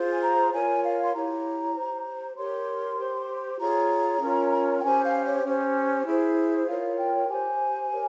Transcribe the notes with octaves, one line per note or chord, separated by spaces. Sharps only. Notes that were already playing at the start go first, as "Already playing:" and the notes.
Already playing: F4 G#4 C5
G#5
A#5
F4 A#4 C#5 G#5
F5
C6
E4 G4 C#5 A#5
G4 C5
G4 A#4 C#5 C6
G4 C5
F4 G#4 C#5 A#5
C#4 F4 A#4 C#5
G5
C#4 G4 C5 G#5
F5
C#5
C#4 G4 C5
E4 G#4 C5
F4 A#4 C#5 F5
G5
G4 C5 G#5
G4 A#4 C#5